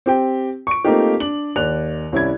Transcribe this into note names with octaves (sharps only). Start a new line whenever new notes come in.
C4 G4 G5
C#6 D7
A3 A#3 C4 D#4 F4 G4
D4 F#7
D#2 D5 F#6 F7
C2 C#4 E4 D5 G#6